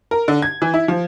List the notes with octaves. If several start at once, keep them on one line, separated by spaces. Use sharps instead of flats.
A#4
D3
G#6
E3
E4
F3